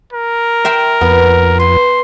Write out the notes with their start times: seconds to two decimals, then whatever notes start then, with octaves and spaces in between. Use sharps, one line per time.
0.13 A#4
0.65 E5 G5 C6
1.01 F2 B3
1.60 B4 C6